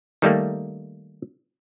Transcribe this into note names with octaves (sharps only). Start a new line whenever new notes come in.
D#3 G3 A3 A#3